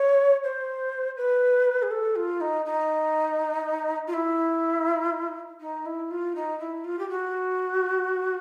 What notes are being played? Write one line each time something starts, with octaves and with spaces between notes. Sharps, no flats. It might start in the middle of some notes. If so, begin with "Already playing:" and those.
Already playing: C#5
C5
B4
G#4
A4
F4
D#4
D#4
F4
E4
D#4
E4
F4
D#4
E4
F4
G4
F#4